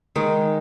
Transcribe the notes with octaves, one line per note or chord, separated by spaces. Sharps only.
D#3 G#3 D#4